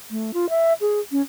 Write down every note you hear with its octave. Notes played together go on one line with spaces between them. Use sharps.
A3
F4
E5
G#4
C#4